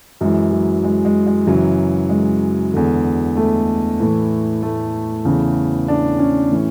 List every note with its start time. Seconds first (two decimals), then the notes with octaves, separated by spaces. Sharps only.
0.21 F#2 E3 G#3
0.53 F#3
0.84 G#3
1.05 G#3
1.27 G#3
1.46 F#2 C#3 E3 F#3
2.09 G#3
2.73 E2 D3
3.37 A3
4.00 A2 E3
4.62 A3
5.24 E2 C#3 E3
5.88 D4
6.19 C#4
6.51 A2 E3